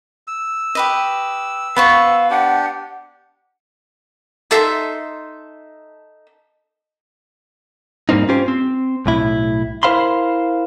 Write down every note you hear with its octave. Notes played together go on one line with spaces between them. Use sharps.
E6
G4 B4 D#5
B3 B4 C5 F5 C#6
D4 G4 F#5
D#4 A4 E5 C6
G#2 G3 A#3 C4 D#4
C#4 F4 G4 C5
C4
B1 A2 E4
E4 A#4 C5 F5 B5 C6